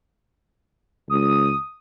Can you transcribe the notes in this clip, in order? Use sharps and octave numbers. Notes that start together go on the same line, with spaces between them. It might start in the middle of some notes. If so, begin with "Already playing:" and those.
C#2 D#6